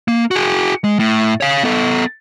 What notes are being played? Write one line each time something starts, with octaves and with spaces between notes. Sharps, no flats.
A#3
F#4 G#4
G#3
A2
C#5 F5
B3 A4